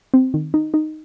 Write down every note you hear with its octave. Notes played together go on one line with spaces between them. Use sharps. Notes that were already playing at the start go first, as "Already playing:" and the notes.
C4
D#3
D#4
D#4